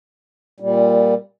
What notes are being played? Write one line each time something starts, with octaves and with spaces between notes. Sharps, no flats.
A#2 G3